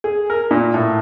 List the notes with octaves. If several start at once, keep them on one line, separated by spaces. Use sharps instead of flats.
G#4
A#4
A#2
A2